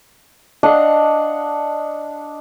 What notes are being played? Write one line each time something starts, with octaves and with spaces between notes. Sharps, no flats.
D4 D#5 F5 F#5